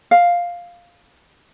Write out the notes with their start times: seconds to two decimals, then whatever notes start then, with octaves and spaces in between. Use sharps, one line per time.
0.11 F5